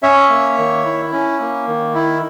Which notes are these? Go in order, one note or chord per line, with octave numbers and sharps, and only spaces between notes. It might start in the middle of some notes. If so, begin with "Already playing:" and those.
C#4 C#5 E5
A#3
D#3
E4
C#4
A#3
D#3
E4